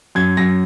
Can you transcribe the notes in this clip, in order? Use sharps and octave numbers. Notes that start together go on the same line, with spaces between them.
F#2 G#6
F#2 A#6